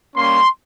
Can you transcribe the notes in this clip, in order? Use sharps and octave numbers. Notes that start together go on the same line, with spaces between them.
G3 A#3 C#4 C6